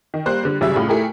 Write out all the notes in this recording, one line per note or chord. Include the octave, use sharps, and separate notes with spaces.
D#3
G3 A#3 C5 F#6
D3 G3
G#1 C#3 F#3 G3 E5 E6
A2 C#3 F4
A3 E4 G4 G#4 A#4